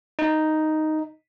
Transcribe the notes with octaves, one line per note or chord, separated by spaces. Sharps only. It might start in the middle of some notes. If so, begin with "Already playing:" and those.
D#4